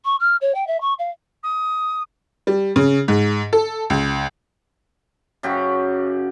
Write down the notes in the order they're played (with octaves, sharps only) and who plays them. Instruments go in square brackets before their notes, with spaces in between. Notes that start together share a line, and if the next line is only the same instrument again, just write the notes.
[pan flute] C#6
F6
C#5
G5
E5
C#6
F5
[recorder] D#6
[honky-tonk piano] G3
C#3
G#2
A4
C#2
[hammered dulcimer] F#2 C#3 G4 F#5